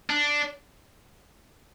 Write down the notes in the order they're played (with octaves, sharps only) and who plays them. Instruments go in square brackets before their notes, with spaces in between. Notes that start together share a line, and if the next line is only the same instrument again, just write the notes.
[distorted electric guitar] D4